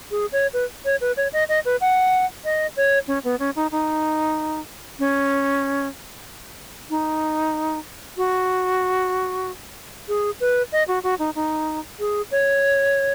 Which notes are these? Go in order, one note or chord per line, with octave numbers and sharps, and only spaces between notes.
G#4
C#5
B4
C#5
B4
C#5
D#5
D#5
B4
F#5
D#5
C#5
C#4
B3
C#4
D#4
D#4
C#4
D#4
F#4
G#4
B4
D#5
F#4
F#4
D#4
D#4
G#4
C#5